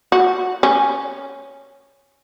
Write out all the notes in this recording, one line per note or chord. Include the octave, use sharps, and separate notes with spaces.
F#4
C#4